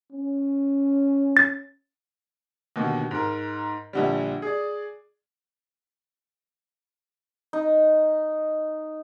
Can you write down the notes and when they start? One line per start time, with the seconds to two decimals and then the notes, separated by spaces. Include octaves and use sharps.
0.12 C#4
1.37 A6
2.76 D#2 B2 D3
3.11 G#2 A#4
3.93 A#1 D3 G3
4.42 G#4 D5
7.53 D#4